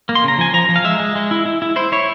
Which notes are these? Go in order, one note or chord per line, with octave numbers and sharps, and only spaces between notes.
A#3
C6
C#3 A#5
F3 G#5
F3 A#5
F3
F5
G#3 E5
G#3
G#3
E4
E4
E4
E4 C5
E4 C#5